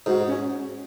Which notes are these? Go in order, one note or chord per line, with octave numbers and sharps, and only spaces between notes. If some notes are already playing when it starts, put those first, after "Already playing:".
G#2 F#4
C#4